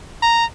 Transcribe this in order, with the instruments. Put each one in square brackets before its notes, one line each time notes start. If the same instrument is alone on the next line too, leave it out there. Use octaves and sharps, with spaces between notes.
[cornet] A#5